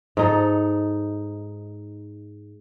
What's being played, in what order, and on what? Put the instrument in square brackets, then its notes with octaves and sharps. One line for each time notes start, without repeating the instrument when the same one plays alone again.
[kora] G#2 D#4 A4